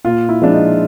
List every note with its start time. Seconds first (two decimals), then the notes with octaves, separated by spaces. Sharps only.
0.05 A#2 F4
0.29 E4
0.42 F3 G#3 D4
0.54 D#4